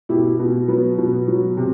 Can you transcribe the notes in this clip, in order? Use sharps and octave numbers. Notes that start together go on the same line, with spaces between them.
B2 E4 G4
B2
F#3 B3
B2
F#3
C3